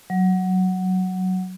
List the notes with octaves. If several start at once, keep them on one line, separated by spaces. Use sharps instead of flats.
F#3